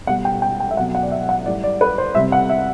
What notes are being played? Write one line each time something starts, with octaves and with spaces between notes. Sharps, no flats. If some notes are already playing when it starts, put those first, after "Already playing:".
B2 G3 F#5
G5
G5
G5
E5
B2 F#3 F#5
F#5
D5
E5
F#5
A2 G3 D5
D5
B4
C5
C3 G3 E5
F#5
E5